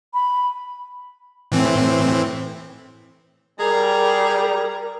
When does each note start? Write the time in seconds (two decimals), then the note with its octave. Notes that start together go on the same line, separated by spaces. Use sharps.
0.14 B5
1.52 A2 E3 C4
3.60 G3 G#4 A#4 A#5